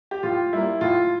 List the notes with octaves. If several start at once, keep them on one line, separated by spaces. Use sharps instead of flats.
G4
A2 F4
G3 A#3 E4
A2 F4